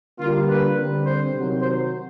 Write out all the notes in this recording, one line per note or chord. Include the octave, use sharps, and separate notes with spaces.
D3 G3 A#3 F4
B4
D3 G3 C4
C5
C3 D#3 F#3
C5